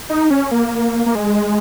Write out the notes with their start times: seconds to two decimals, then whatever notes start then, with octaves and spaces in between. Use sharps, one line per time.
0.10 D#4
0.30 C#4
0.51 A#3
1.06 A#3
1.15 G#3